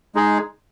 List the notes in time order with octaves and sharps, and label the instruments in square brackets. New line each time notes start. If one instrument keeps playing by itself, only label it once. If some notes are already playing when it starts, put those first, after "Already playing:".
[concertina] G#3 D#4 G#4